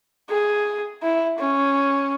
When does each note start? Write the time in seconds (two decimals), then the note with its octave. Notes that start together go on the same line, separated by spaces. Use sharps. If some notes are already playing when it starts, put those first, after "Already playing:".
0.29 G#4
1.02 E4
1.38 C#4